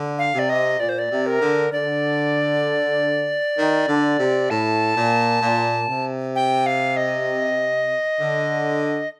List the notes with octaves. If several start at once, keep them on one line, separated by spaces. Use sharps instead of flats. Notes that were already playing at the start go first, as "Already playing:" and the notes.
Already playing: D3
F5
C3 D5
D#5
A#2 D5
C5
D5
C3
A#4
D3
D3 D5
D#3
D3
C3
A2 A5
A#2
A#2
C3
G5
F5
D#5
D3